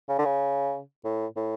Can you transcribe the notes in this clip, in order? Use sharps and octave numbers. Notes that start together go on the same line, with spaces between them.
C#3
D3
C#3
A2
A2